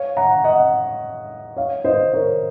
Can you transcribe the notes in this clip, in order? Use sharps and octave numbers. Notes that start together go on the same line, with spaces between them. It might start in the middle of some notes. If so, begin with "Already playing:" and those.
Already playing: C#5 F5
F#5 A#5
D#5 F#5
C#5 F5
C5 D#5
A#4 C#5